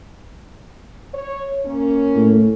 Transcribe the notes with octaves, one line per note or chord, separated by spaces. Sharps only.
C#5
A#3 C#4
A2